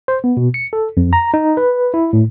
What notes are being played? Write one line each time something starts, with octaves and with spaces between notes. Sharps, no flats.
C5
B3
B2
C#7
A4
F2
A#5
D#4
B4
E4
A2